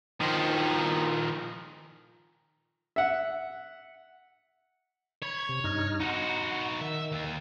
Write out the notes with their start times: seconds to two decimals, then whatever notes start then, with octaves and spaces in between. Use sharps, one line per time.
0.21 D#3 F3
2.96 E5 F#5
5.22 C#5 B5 G#6
5.49 C3
5.64 G2 D#4 F6
6.00 D#4 F#4 F#5 A#5 C6
6.81 D#3 E5
7.12 D#2